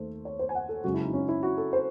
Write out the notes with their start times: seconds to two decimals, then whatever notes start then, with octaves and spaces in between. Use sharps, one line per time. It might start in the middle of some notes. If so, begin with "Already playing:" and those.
Already playing: D#2 D#3 A3 C5
0.25 C#5
0.39 C5
0.49 G#5
0.55 F#5
0.69 A4
0.84 F#2 C#3 G#3 F#4
0.94 E4
1.04 D#4
1.13 C#4
1.29 E4
1.43 F#4
1.58 A4
1.73 C5